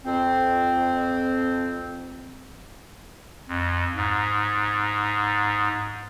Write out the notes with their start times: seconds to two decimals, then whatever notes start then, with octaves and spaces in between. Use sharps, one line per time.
0.05 F2 C4
3.48 F2
3.96 G#2